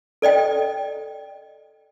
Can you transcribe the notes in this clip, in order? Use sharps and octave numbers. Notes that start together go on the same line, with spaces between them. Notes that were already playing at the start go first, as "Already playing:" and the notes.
A4 D5 D#5 G5